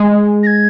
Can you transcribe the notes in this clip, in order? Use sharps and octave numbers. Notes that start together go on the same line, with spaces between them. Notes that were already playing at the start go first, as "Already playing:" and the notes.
Already playing: G#3
A#6
G#6